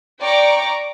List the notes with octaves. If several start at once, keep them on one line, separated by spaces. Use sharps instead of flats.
D5 G5 A#5 C#6 D6